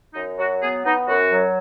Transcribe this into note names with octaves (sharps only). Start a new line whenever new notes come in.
F#2 D#4
F#3 F#4
B3 G#4
B3 D#4
F#2 F#4
F#3